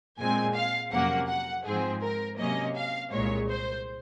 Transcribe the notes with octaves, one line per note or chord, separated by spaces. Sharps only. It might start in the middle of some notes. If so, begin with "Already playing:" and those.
A#2 G#3 C4 G#5
F5
F2 C3 F#3 A#3 C#4 F#5
F#5
G#2 F3 C4 G#4
A#4
C3 F#3 A#3 C#4 D#5
F5
C2 A#2 G#3 C#5
C5